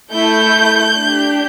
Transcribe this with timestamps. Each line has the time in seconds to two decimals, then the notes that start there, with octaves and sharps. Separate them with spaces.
0.11 A3 E4 A4 G6
0.97 D4
1.02 G4